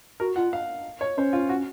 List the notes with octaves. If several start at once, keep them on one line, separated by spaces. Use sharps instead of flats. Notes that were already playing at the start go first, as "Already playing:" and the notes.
F#4 A#4
F4 F#5
F5
C#5
C#4 C5
F4
F#4